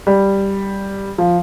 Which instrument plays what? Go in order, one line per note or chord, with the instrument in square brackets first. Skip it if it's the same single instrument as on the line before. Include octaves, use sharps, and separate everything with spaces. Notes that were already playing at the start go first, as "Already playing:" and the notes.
[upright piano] G3
F3